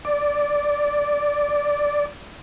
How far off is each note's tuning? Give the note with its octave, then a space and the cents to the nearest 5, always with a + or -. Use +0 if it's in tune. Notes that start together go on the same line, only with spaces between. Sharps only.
D5 -5